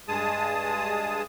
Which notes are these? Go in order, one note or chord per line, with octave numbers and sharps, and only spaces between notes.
G2 G#3 G#4 A5 D#6